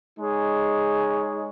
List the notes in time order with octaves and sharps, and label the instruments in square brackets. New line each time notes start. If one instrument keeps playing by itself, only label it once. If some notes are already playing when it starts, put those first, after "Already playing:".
[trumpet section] G#3 D#4 G#4 C#5